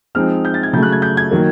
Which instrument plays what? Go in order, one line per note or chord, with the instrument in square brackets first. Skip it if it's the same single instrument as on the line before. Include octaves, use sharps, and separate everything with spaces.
[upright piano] F3 G#3 C4 D#4 F6
G6
A6
G#6
C#3 F#3 A3 G6
F#6
G#6
G6
G#6
D#3 F#3 A#3